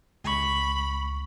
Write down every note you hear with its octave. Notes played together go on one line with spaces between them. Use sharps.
C#2 B5 C#6